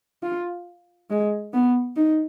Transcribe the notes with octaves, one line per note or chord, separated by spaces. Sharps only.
F4
G#3
B3
D#4